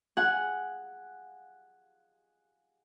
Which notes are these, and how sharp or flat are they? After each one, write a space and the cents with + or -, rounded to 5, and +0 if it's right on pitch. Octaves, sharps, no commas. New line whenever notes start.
G#4 +0 F#5 +0